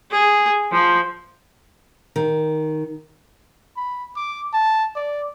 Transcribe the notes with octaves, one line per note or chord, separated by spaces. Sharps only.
G#4
F3
D#3
B5
D6
A5
D5